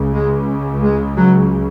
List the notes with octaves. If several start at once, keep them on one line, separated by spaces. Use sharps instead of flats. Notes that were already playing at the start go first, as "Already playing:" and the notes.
Already playing: C#2 C#3
G#3
G#3
F#3